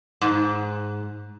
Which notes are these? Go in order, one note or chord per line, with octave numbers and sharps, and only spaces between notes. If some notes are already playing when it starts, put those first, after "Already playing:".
G#2